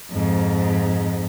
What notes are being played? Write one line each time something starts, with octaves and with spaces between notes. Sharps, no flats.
F2 G#2